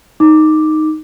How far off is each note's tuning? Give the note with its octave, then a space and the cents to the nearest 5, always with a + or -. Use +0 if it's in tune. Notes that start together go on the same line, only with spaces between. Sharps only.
D#4 +0 D6 +0